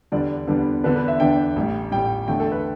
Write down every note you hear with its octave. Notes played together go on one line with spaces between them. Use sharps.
E2 D3 G3 B3 D4 D5
E2 D3 G3 B3 D4
E2 D3 B3 D4 B4
B4
E5
E2 D3 B3 D4 G5
A1 A2 G3
A1 A2 G3 G5
E2 D3 A3 G5
A4
B4